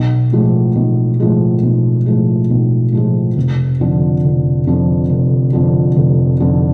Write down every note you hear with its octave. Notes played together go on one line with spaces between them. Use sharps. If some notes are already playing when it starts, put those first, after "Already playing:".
Already playing: B1
A2 F3 G#3
B1
A2 F3 G#3
B1
A2 F3 G#3
B1
A2 F3 G#3
F1
F2 D3 F3
F1
F2 D3 F3
F1
F2 D3 F3
F1
F2 D3 F3